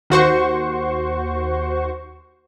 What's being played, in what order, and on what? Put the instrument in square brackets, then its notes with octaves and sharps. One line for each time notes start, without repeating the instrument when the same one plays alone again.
[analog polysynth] D#2 F#4 C5 C#6